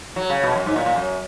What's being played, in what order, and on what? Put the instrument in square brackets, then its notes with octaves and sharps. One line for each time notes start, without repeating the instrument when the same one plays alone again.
[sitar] F#3
C#3
B2
F#2
G#2
A#2
A#2
F#2